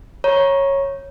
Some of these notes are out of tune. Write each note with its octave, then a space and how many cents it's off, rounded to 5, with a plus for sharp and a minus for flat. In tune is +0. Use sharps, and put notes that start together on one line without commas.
C#5 -10 A#5 +20